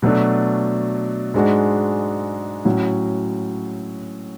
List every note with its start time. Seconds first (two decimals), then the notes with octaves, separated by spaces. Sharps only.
0.02 B2 F#3 A3 D4
1.34 G#2 G#3 D4 F#4
2.65 A2 F#3 C#4 F#4